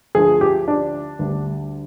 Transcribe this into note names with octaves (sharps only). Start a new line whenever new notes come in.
D2 D3 F3 G#4
G4
D4
D2 D3 G3